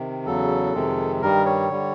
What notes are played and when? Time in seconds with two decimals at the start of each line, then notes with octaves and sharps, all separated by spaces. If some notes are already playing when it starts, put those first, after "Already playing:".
Already playing: C3 D#3
0.26 E2 C#3 F#3 A4
0.74 F2 C3 D#3 G#3
1.21 G2 D#3 G3 A#4
1.45 C#5
1.70 D3 G3